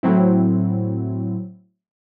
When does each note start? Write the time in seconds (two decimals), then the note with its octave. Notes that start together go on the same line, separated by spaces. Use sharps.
0.03 A2 F#3 C4 E4